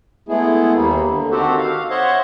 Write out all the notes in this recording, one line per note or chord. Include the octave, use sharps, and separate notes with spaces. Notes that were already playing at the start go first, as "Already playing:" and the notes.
G#3 A3 B3 E4 G#4
D#2 G3 A#3
D3
D#3 C4 F#4 G4 A4 C5
F5
C5 C#5 D#5 E5 F#5